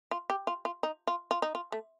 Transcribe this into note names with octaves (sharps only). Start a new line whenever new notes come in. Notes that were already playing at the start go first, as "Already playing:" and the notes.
F4
G4
F4
F4
D#4
F4
F4
D#4
F4
A3